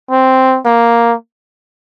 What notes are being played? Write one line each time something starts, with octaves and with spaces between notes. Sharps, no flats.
C4
A#3